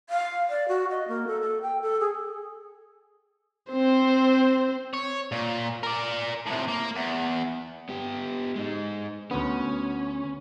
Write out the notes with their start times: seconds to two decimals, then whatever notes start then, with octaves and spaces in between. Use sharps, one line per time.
0.10 F5
0.50 D5
0.68 F#4
0.91 D#5
1.08 A#3
1.27 A4
1.41 A4
1.62 G5
1.82 A4
2.00 G#4
3.72 C4 C5
4.93 C#5
5.32 A#2
5.83 A#4 D5
6.47 A2 C3
6.68 A#3
6.95 E2
7.89 B3 G4
8.55 G#3 D#4
9.31 D2 B3 C#4